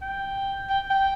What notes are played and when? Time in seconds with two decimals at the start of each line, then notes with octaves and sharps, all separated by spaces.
0.02 G5
0.70 G5
0.90 G5